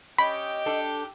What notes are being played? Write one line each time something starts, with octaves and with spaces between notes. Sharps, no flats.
C#4 G4 D#5 G5 B5
D4 A4